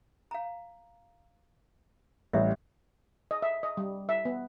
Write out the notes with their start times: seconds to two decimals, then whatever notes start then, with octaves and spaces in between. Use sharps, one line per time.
0.31 F5 A#5
2.33 A1 G3 E5
3.31 D#5
3.42 E5
3.63 D#5
3.77 G3
4.09 E5
4.25 B3